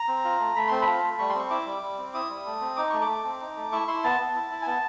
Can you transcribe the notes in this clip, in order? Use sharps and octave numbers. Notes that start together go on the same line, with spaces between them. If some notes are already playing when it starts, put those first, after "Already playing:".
Already playing: A#5
C4
F4
A3
A3 B5
C4 C6
F4 B5
A3
G3 C#6
C6
C4 C#6
E4 D6
G3
G3
C4
E4 D#6
G3
A3
C4
D#4 D6
A3 C#6
D6
A3
C4
D#4
A3
E4 C#6
E4 C6
B3 A5
B3
E4
E4
G#5
B3 A5